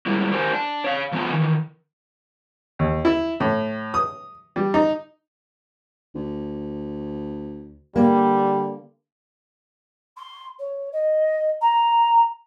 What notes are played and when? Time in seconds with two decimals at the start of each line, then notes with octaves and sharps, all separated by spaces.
0.06 G3 G#3 A#3 E4
0.32 G4 A#4 C5 G5 G#5
0.53 D4
0.84 C#5 F5
1.12 F3 A3 B3 D#5 G#5
1.31 D#3 E3
2.79 D#2
3.05 E4
3.40 A2
3.94 D#6
4.56 G3
4.74 D#4
6.15 D2
7.96 D3 G3 A#3
10.16 C6
10.58 C#5
10.92 D#5
11.61 A#5